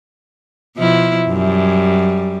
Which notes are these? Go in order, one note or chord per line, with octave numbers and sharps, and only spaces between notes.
B2 F3 E4
F#2 G3